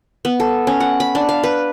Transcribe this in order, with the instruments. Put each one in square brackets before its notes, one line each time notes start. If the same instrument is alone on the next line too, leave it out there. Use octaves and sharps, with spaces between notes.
[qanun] B3
A4
C#4
F#5
B5
D4
F5
B4